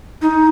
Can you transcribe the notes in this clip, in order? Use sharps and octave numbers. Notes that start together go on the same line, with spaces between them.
D#4